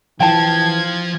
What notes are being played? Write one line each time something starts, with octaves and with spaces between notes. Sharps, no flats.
E3 F3 G5 A5 G#6